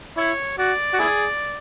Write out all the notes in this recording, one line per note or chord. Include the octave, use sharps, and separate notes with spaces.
E4 C#5
F#4 D5
F#4
E4 G#4